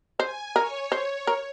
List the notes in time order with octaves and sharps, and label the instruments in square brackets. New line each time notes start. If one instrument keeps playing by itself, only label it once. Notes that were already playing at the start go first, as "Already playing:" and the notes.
[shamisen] C5 [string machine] G#5
[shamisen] A#4 [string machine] C#5
[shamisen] C5
A#4